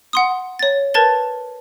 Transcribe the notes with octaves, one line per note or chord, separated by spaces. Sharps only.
F#5 C6 D#6
C#5 A6
A#4 B4 A5 G#6 A6 G7